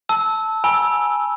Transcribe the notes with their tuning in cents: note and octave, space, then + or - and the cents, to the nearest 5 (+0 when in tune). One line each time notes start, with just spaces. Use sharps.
A5 +0 E6 -15
G#5 +0 B5 -35 E6 +0